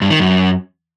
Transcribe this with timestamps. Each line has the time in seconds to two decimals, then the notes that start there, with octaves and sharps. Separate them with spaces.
0.01 G2
0.10 D#3
0.19 F#2